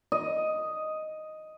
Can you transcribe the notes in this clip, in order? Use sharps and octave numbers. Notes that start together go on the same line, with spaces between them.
D#5